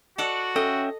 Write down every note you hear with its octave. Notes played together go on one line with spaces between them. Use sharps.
F#4 A4 D5 D#5 F#5
C#4 A4 D#5 E5 G5